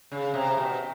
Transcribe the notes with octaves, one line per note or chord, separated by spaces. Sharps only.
C#3
C3
B2